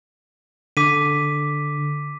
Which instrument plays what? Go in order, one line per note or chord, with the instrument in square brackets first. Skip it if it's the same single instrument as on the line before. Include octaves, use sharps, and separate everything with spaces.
[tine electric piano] D3 [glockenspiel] D6 B6 D#7